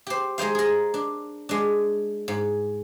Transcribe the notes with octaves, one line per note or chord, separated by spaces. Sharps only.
G4 C5
G#3 D#4 C5 F5
G#4 A#4
D4
G#3 D4
G#2